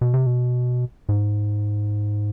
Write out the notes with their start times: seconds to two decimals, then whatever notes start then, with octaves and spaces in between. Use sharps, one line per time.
0.01 B2
0.14 C3
0.26 B2
1.09 G#2